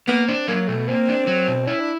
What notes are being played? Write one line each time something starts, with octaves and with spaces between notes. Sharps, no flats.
A#3 B3
C4 D4
F#3 A#3
B2 A3
A#3 C4
D4
F#3
B2
C#4 E4
D4